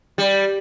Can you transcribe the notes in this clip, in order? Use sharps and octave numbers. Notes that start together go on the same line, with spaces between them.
G3